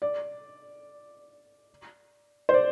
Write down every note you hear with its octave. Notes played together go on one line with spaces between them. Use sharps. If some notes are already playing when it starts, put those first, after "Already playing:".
D5
C5
D5